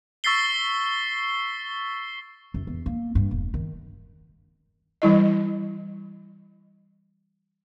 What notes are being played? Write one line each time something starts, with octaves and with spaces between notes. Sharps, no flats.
C#6 E6 A6 B6 C7 G7
F#2
E2
A#3
G2
E1
D#3
E3 G3 E4 D#5